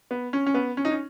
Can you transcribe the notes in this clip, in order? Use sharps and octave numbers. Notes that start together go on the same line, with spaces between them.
B3
C#4
C#4
B3
C#4
D#4
C#4